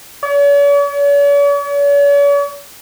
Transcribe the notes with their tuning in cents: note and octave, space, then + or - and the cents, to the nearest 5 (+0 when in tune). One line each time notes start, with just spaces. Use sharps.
C#5 +45